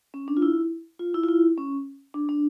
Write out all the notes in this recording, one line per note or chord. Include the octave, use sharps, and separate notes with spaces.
C#4
D4
F4
E4
F4
E4
F4
E4
C#4
D4
D4